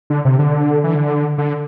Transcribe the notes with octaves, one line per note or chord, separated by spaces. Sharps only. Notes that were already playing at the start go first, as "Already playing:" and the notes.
D3
C3
D3
E3
D3
D3